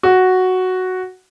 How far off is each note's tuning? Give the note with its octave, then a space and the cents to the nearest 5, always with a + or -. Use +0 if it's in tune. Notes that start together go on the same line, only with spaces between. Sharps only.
F#4 +0